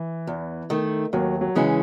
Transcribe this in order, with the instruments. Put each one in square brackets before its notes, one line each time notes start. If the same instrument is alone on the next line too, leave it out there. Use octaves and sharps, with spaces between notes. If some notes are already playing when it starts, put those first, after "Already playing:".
Already playing: [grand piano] E3
[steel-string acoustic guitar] E2
D#3 A3
[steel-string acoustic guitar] D#2 [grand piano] F#3
[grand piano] F#3
[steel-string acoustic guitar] C#3 E3 G#3 C#4